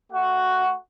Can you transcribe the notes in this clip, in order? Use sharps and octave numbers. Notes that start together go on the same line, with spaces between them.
A3 F#4 F#5